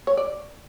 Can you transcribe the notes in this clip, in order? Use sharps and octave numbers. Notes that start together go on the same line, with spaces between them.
C#5
D5